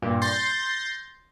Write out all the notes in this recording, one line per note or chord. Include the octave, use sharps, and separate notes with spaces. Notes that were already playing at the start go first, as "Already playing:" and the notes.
G2 A#2
C6 G6 A6 A#6 C7